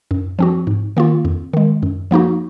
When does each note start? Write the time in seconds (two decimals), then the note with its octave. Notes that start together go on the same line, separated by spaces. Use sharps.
0.11 F#2
0.39 F3 C4 F#4
0.67 G#2
0.97 D#3 A#3 F4
1.25 F2
1.53 D#3 G#3
1.83 F#2
2.11 F3 A#3 D#4 F#4